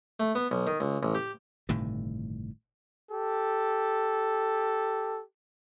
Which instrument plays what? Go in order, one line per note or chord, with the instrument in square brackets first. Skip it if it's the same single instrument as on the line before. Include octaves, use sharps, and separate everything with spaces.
[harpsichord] A3
B3
B1
D#3
C#2
A1
G4
[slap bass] G1 A2 C3 D#3
[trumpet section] G4 A4